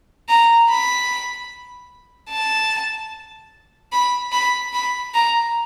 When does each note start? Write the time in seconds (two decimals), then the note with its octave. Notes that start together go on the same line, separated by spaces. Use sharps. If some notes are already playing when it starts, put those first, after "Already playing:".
0.29 A#5
0.69 B5
2.30 A5
3.92 B5
4.32 B5
4.73 B5
5.14 A#5